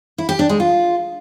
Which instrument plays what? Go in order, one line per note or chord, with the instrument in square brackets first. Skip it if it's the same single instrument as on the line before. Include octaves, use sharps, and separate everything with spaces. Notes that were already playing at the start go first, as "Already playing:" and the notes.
[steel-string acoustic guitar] E4
G4
D4
G#3
F4